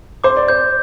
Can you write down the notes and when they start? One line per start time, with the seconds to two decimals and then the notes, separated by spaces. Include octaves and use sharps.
0.24 C5 D6
0.37 D5
0.48 C5 G6